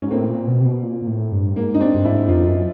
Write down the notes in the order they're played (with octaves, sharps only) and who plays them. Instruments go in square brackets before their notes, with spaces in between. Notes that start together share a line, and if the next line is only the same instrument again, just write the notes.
[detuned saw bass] G#2 [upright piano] C#4
[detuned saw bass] A2 [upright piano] A#3 C4
[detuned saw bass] A#2
B2
C3
B2
A#2
A#2
A2
G2
[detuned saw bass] G#2 [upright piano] A#3
[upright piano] D#4
C4 D4
[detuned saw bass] G2
[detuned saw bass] G#2 [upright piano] D4 E4
[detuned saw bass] F2 [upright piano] D#4 F4
[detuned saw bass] F#2